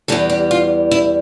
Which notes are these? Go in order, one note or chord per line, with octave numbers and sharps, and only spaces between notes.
E2 E3 G3 A4
G4
F4
E4